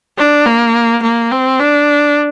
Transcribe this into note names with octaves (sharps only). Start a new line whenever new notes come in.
D4
A#3
A#3
C4
D4